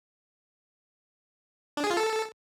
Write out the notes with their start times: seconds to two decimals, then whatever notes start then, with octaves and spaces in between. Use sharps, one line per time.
1.77 D4
1.84 G#4
1.90 F4
1.97 A4